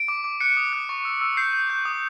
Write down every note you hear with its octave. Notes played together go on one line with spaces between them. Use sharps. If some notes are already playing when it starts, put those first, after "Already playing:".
Already playing: D7
D6
D6
F#6 C#7
D#6
F#6
C#6
E6
E6
G6 C7
G6
G6
D#6